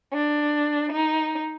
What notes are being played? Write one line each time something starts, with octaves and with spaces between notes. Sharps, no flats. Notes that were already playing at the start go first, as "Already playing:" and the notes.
D4
D#4